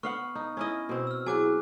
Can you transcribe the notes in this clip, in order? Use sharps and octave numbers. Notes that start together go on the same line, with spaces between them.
B3 F5 F#5 C#6 F6
D#4
C#4 E4 D#5
B2 C4
E6 F6
F#3 E4 G#4 G#5 D6 F#6